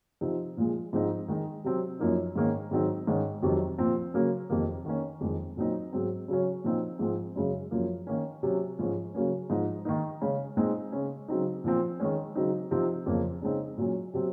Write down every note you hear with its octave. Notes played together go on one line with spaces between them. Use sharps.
C3 F3 C4 D#4
A#2 F3 G#3
G#2 F3 C4 D#4
D#3 G#3 D#4
C3 F#3 C4
F#2 F3 A#3 D#4
G#2 D#3 A#3 C#4
G#2 D#3 F#3 C4 D#4
G#2 D#3 G#3 C#4
F2 C3 D#3 F#3
A#2 F3 C4
C#3 F#3 A#3 C#4
F2 C3 D#3 A#3
D#3 A#3 C#4
F2 D#3 G#3
A#2 F#3 C4 D#4
G#2 F#3 C4
C#3 F#3 C#4
A#2 F3 C4 D#4
G#2 F3 G#3 C4
F#2 C#3 G#3
F#2 F3 A#3
D#3 A#3 C#4
C3 F#3 C#4
G#2 F3 G#3 C#4
C#3 F#3 A#3 C#4
G#2 F3 G#3 D#4
D#3 A#3 D#4
C#3 G#3 C#4
A#2 G#3 C4 D#4
C#3 G#3 C#4
C#3 F#3 C4 D#4
A#2 F3 C4
D#3 G#3 C#4
C#3 F#3 C4 D#4
C3 F3 C4 D#4
F2 C#3 F3 A#3
C#3 G#3 C4 D#4
A#2 F#3 C#4
C3 F#3 C4